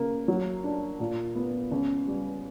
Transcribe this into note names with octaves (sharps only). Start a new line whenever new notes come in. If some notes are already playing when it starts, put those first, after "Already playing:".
Already playing: C#3 A#3
F#3
D4
A#2
B3
C#2
G3